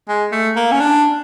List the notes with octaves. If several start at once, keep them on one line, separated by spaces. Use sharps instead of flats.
G#3
A3
A#3
C#4
D4